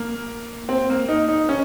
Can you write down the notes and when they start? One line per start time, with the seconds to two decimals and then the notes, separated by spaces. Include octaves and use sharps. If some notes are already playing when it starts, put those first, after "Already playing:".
Already playing: A#3
0.69 C4
0.90 A#3
1.09 D#4
1.28 D#4
1.49 C#4